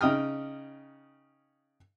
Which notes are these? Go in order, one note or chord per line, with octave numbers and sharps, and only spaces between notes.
C#3 D#4 G5 D#6 F6